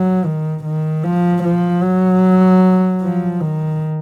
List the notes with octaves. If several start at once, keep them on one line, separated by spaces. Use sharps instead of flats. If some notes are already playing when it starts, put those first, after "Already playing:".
Already playing: F#3
D#3
D#3
F3
F3
F#3
F3
D#3